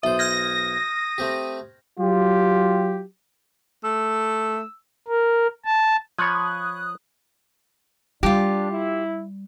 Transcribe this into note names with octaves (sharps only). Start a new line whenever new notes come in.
B1 C5 E5 D#6
F6 G6 G#6 A#6
A3 C4 G4
F#3 F4 G4
A3 E6
A#4
A5
F3 C#5 B5 C#6 D#6 F#6 G#6
G3 D4 F4 G4
E4